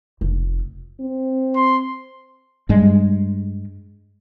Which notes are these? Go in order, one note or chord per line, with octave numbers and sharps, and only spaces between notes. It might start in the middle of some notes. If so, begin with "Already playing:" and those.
F1
C4
C6
G2 G3 G#3